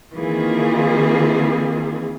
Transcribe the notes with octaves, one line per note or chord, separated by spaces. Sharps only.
D#3 E3 A#3 C4 F4 G#4